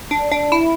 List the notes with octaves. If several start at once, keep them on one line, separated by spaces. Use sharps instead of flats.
D4
D4
E4